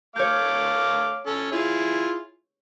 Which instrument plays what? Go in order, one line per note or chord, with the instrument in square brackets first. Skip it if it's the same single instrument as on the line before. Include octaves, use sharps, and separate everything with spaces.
[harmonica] A3 F5 D6 [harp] C#5 G6
[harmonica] C#4 A4
E4 F4 G#4